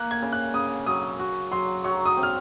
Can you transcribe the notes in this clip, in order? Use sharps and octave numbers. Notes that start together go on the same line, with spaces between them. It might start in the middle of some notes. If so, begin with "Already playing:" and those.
Already playing: A#3 F#6
G#6
C#3
F#6
C#3 D#6
F#3 D#6
F#4
F#3 C6
F#3 C#6
D#6
C4
F6